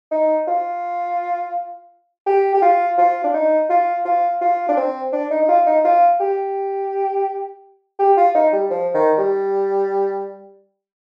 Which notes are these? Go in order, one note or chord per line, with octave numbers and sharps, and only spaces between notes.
D#4
F4
G4
G4
F4
F4
D4
D#4
F4
F4
F4
D4
C4
D4
D#4
D#4
F4
D#4
F4
G4
G4
F4
D#4
G3
F3
D#3
G3